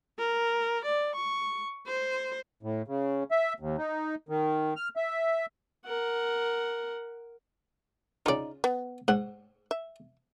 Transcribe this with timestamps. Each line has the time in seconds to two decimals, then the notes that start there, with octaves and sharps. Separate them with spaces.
0.18 A#4
0.85 D5
1.16 C#6
1.87 C5
2.63 A2
2.88 C#3
3.31 E5
3.60 D#2
3.78 D#4
4.29 D#3
4.76 F6
4.96 E5
5.86 A#4 F#5
8.26 C#3 D#4 F4 D5
8.64 B3
9.08 G#2 F#5
9.71 E5